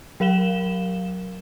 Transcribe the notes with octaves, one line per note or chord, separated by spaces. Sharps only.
F#3 A#4 F5 E7 G7